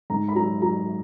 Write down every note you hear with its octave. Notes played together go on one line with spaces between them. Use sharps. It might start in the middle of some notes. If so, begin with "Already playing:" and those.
G#2 A#5
B5
F#3 A#5
F#3 A#5